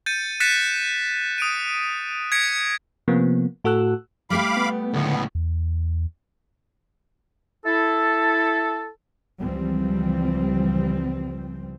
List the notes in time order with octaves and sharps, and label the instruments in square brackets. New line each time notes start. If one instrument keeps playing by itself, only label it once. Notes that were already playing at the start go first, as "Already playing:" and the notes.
[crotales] G6 A6 C#7 D#7
F#6 A6 B6 C#7 E7
D#6 D7 D#7
G#6 A#6 B6 C#7 D7
[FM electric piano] C3 F3 A#3 B3
A2 F#4 A4 E6 F#6
[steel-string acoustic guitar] G3 A3 G4 [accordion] F5 B5 D6
[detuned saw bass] B3
[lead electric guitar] C#2 A2 [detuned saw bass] D3 [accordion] B3
[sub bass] E2
[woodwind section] E4 A4
[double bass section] C#2 E3 F3 G3 C4